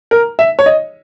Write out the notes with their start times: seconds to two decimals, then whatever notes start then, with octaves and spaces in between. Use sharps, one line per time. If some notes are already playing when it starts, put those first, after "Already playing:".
0.11 A#4
0.39 E5
0.59 C#5
0.66 D#5